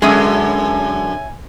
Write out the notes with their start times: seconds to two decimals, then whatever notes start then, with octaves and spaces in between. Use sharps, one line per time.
0.02 F#2 D3 G#3 C#4 E4 G#5 D#6